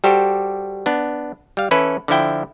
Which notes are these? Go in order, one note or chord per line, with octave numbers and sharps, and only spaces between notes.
G3 F#4 G4 A4 C5
B3 D4
G3 F5
E3 C#4 E4 A4 B4
D3 F3 E4 G5